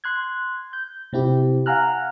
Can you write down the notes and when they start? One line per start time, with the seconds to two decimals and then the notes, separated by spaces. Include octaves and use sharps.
0.04 C6 F#6 G#6
0.73 G6
1.13 C3 C4 E4 G4
1.66 F5 F#5 G#5 A#5 F6 F#6